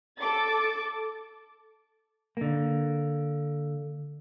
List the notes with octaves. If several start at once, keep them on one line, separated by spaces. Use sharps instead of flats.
A4 D6 A6
D3 A#3